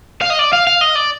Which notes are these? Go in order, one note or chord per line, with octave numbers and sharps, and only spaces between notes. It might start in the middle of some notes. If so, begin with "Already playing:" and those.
F5
D#5
D5
F5
F5
D#5
D5